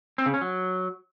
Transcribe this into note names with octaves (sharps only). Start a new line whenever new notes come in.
C4
C#3
C#4
F#3